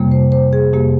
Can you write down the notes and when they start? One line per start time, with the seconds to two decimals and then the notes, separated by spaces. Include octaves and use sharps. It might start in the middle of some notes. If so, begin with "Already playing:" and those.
Already playing: F2 C3 G3 A#3
0.11 C5
0.32 C5
0.53 G#4
0.73 F2 C3 G3 A#3 G4